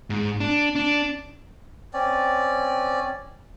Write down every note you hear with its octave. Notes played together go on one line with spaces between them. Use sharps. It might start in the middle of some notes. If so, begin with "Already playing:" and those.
G#2
D4
D4
C4 C#4 D5